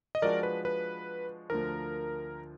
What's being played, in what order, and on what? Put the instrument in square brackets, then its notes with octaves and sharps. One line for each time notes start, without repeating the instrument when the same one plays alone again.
[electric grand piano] D#5
[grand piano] F3 G#3 D4 F#4 [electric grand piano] A#4 D5
[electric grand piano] B4
B4
[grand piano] D2 D3 F3 [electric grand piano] A#4